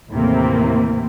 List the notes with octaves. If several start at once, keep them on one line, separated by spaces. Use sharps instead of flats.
D#2 A2 C3 E3 A#3 C4